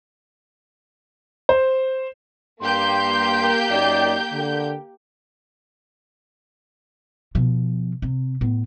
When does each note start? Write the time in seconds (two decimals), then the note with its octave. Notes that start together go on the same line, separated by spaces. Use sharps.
1.49 C5
2.63 G2 A#3 G4 C6 G6
3.70 F#2 D#4 D5
4.32 D3
7.35 B2 F3
8.02 C3
8.41 A2 B3